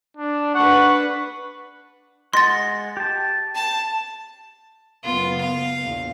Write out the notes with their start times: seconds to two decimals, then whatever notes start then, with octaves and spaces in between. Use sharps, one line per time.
0.17 D4
0.55 D4 B4 F#5 C#6
2.33 G#3 D#5 F#5 C6 A6
2.97 G4 A5
3.55 A5
5.04 F#1 B3 F4
5.41 F5
5.82 A#1 E2